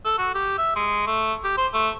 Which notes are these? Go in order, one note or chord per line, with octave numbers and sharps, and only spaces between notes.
A4
F#4
G4
E5
G#3
A3
G4
C5
A3